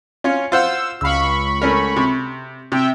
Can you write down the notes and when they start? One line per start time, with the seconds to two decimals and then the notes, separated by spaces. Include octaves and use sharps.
0.24 C#4 F4 C#5
0.52 F4 C5 F#5 E6
1.01 C#2 F5 B5 C#6 E6
1.62 A3 C#4 A#4
1.96 C3
2.72 C3 E5 G5